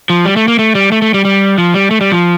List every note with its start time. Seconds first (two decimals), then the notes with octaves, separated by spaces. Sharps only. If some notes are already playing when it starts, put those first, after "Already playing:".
0.10 F3
0.25 G3
0.36 A3
0.48 A#3
0.59 A3
0.75 G3
0.92 A3
1.02 A3
1.14 G3
1.25 G3
1.58 F3
1.74 G3
1.91 A3
2.01 G3
2.12 F3